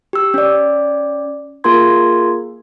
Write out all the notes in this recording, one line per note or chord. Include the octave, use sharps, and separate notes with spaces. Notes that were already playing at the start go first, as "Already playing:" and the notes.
G4 E6
C#4 D5
A#3 F4 G#4 A#4 C6 G#6